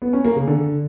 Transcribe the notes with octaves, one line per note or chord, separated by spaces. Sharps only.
B3
C#4
A#3
C#3
D3